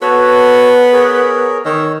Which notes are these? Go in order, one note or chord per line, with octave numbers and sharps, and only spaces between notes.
B3 F#4 A4 C#5
G#4 A#4 C#5
D#3 C#5 E6